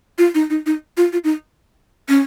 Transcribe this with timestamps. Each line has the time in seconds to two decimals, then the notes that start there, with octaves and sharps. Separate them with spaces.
0.18 F4
0.35 D#4
0.50 D#4
0.66 D#4
0.97 F4
1.13 F4
1.24 D#4
2.09 C#4